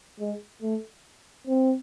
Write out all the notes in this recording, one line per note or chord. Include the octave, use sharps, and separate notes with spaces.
G#3
A3
C4